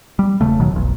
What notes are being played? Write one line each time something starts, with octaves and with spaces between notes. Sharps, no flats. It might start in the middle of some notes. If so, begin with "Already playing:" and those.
G3
E1 C2 C#3 A3
D#2 B2 D#3 F#3
F1 B1